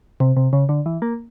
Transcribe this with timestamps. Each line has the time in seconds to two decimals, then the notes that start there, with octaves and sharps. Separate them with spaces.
0.20 C3
0.37 C3
0.53 C#3
0.69 D3
0.86 E3
1.02 A#3